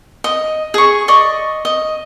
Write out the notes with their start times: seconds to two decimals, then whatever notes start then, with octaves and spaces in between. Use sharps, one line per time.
0.24 D#5
0.74 G#4 C#6
1.08 D5 D#5 C#6
1.65 D#5